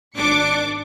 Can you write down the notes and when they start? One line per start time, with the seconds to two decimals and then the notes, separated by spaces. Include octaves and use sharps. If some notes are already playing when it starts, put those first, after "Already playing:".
0.17 G#1 D4 D6 C#7